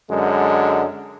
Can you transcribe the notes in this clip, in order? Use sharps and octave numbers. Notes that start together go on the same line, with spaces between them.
F#2 D3 G#3